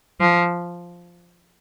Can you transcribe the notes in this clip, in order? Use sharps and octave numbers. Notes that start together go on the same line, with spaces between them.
F3